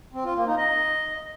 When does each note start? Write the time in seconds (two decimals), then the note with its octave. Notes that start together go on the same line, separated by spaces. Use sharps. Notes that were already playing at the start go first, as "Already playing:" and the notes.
0.13 C4
0.24 F4
0.35 A#3
0.47 D#4
0.58 D#5